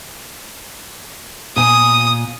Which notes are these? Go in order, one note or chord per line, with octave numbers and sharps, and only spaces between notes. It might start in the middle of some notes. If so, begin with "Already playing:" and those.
A#2 G#5 D#6